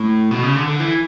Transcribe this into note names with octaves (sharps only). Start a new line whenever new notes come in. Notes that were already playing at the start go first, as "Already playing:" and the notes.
Already playing: A2
B2
C#3
D3
D3
E3